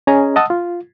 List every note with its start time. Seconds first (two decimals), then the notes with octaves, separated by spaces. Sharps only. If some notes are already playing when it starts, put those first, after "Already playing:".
0.07 C#4 G#4 D#5 G#5 A#5
0.36 D#5 F#5 A5 D#6 E6
0.50 F4